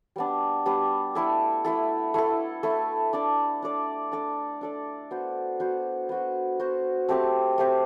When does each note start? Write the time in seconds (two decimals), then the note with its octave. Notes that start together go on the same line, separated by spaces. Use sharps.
0.16 G3 B3 D4
0.66 G3 B3 D4
1.15 A3 E4 A4
1.65 A3 E4 A4
2.14 A3 E4 A4
2.63 A3 E4 A4
3.13 D4 A4 D5
3.62 D4 A4 D5
4.12 D4 A4 D5
4.61 D4 A4 D5
5.11 B3 F#4 C5
5.60 B3 F#4 C5
6.09 B3 F#4 C5
6.59 B3 F#4 C5
7.09 A3 C4 G4 C5
7.58 A3 C4 G4 C5